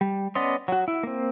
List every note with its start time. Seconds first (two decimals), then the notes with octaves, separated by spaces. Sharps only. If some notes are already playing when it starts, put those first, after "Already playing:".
0.01 G3
0.35 B3 C#4 D5 D#5 C6
0.68 F#3 F#4
0.88 E4
1.03 A#3 C4